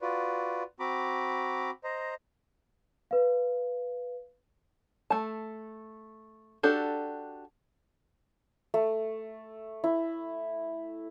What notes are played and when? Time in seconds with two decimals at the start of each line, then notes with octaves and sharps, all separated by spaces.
0.01 F4 F#4 B4 D5
0.80 C4 F#4 A#5 B5 D6
1.84 C5 D#5 A#5
3.11 B4 F5
5.10 A3 A5
6.63 D4 F#4 G4 A4
8.74 A3
9.84 E4